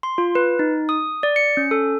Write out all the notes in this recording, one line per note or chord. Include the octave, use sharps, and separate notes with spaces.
C6
F4
B4
D#4
D#6
D5
C#7
C#4
A4